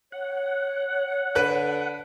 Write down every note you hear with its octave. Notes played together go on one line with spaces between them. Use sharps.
C#5 F#5
D3 B4 F#6